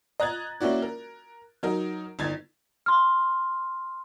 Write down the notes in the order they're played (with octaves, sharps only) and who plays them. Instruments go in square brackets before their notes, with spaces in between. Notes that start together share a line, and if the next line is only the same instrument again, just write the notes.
[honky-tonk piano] D#5 A#5 F#6 G#6 A6
A#3 C#4 E4 F#4 D5
A#4
F#3 D#4 A#4
G1 D#4 G#6 A6
[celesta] C6 F6